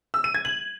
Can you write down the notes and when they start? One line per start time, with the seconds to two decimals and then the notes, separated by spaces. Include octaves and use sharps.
0.14 E6
0.24 D#7
0.34 G#6
0.45 F#7